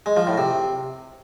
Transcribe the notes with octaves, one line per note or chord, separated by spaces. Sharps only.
G#3
F3
A2
C3